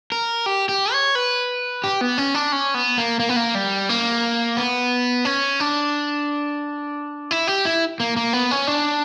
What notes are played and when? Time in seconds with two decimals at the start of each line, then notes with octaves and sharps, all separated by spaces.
0.12 A#4
0.46 G4
0.69 G4
0.93 C#5
1.15 B4
1.84 G4
2.01 B3
2.18 C#4
2.35 D4
2.52 C#4
2.74 B3
2.98 A#3
3.20 A#3
3.29 B3
3.36 A#3
3.55 G3
3.89 A#3
4.57 B3
5.25 C#4
5.60 D4
7.31 E4
7.47 G4
7.65 E4
8.00 A#3
8.16 A#3
8.33 B3
8.51 C#4
8.67 D4